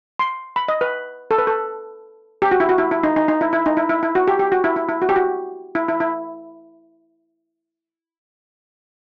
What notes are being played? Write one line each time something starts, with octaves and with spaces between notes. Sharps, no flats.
C6
B5
D#5
B4
A4
B4
A4
G4
F#4
E4
F#4
E4
E4
D#4
D#4
D#4
E4
E4
D#4
E4
E4
E4
F#4
G4
G4
F#4
E4
E4
E4
F#4
G4
F#4
E4
E4
E4